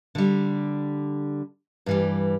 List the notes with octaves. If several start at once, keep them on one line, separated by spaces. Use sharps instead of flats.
D3 G3
G2 E3 G3